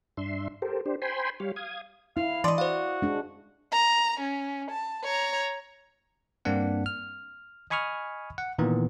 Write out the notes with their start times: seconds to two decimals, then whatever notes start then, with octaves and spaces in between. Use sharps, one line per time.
0.17 G2 D4 E5 C6
0.62 G4 A4 A#4 C5
0.86 D4 G4 C5
1.02 C5 G5 G#5 B5 C6
1.40 G3 G4 C#5 F5
1.56 F5 D#6 G#6
2.17 E4 F5
2.44 E3 D5 D#5 C6
2.58 F#4 C5 F5
3.02 G#3 D4
3.72 A#5
4.20 C#4
4.71 A5
5.04 C#5 A#5
6.45 G2 A#3 C4 D4 F#5
6.86 F6
7.70 D#5 G#5 B5 C#6 D#6 F6
8.38 F#5
8.58 A#2 D#3 E3 B3